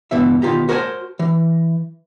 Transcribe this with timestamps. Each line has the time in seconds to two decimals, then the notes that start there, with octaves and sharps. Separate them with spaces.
0.11 C#2 G2 B2 E3 E5
0.42 B2 D#3 F4 G4 A#5
0.69 F#4 A#4 C5 C#5 G#5 A5
1.19 E3